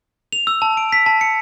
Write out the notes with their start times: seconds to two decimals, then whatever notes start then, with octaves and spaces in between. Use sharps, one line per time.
0.33 F7
0.47 E6
0.62 A5
0.77 D7
0.92 B6
1.06 A5
1.21 C#7